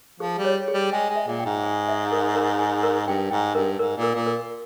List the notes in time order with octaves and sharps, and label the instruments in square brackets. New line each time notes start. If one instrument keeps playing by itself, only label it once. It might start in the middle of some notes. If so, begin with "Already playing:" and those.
[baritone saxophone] F3 [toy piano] G#4
[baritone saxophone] G3
[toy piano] C#5
G#4
[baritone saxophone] G3
[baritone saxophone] G#3 [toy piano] G5
[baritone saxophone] G#3
[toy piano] E5
[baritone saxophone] A#2
[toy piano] G5
[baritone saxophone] G#2
[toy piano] G#5
E5
A#4
A#4
G#5
A#4
[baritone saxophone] G2 [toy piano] G5
[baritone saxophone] G#2 [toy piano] G5
[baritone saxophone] G2 [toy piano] A#4
[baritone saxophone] G#2 [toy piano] A#4
[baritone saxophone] A#2
[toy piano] A#4
[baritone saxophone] A#2
[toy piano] A#4